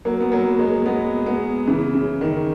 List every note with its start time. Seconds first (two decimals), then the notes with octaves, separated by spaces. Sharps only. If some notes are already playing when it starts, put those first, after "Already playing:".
0.05 F#3 A#3
0.21 B3
0.32 F#3 A#3
0.59 G#3 B3
0.86 G#3 B3
1.26 G#3 B3
1.67 C#3 E3
1.94 C#3
2.21 D#3